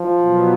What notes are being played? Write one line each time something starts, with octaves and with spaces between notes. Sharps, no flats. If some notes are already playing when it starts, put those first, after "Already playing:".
Already playing: F3
B2 F#3 B3